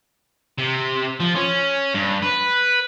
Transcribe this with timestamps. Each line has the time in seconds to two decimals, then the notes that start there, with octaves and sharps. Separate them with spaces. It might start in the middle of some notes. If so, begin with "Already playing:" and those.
0.58 C3
1.20 F3
1.35 C#4
1.94 G2
2.22 B4